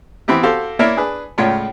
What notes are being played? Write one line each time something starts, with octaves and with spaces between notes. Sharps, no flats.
E3 B3 C4 E4 G4
F#4 G4 A4 C5 F5
A#3 E4 A#4 C#5 D5 E5
D4 G#4 B4
C#2 A2 F4 C#5 D5